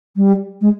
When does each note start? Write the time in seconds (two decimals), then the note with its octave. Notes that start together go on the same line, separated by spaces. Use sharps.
0.16 G3
0.61 G#3